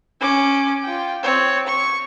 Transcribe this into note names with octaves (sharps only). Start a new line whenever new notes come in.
C#4 D6
F4 G5
C4 C#5
C#6